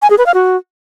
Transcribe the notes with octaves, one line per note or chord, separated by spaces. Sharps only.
G#5
G#4
B4
F5
F#4